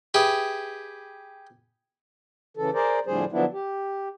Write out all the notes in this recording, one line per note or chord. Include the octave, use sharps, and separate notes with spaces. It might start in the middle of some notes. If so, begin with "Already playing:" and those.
G4 G#4 B4 E5
C#3 E3 A4
G#4 A#4 C5 D5
F2 A2 D3 G3 G#4 C5
D3 F3 F#3 B3 D4 E4
G4